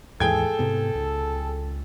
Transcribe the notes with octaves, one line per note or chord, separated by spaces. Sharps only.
D#2 G#2 E3 G#4 A4 G5 G#6
G#2 C3 B3
C#2